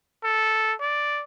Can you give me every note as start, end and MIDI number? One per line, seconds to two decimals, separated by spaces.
0.24 0.73 69
0.81 1.23 74